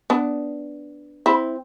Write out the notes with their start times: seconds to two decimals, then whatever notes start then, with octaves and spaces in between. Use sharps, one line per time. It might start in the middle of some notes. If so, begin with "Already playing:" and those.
0.10 B3 D4
1.26 C4 E4